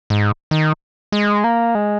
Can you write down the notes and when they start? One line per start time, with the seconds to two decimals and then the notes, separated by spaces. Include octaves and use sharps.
0.10 G#2
0.51 D#3
1.12 G#3
1.44 A#3
1.75 G#3